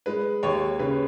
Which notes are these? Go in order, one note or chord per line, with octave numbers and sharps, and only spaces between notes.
G#3 B4
D#2 C#5
C#3 B4